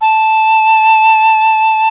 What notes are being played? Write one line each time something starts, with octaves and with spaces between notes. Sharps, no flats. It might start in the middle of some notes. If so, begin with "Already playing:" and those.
A5